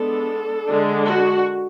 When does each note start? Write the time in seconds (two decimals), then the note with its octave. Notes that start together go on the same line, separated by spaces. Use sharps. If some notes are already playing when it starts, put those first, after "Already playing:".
Already playing: G#3 B3 D4 A4
0.67 D3 G#3 D4
1.06 F#4